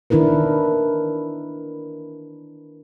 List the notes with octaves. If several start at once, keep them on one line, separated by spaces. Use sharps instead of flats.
D#3 D4 E4 A#4 B4